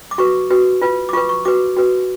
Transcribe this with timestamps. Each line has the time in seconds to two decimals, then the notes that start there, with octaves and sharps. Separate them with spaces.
0.11 D6
0.18 F#4 B4 C#6
0.50 F#4 B4
0.82 F4 B4
1.09 D6
1.13 F4 B4 C#6
1.29 C#6
1.45 F#4 B4 D6
1.77 F#4 B4